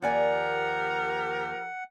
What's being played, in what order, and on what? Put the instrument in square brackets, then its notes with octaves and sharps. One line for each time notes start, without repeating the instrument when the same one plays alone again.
[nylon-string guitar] D#2 D5 G#5 [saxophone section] F3 G4 A#4 [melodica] F#5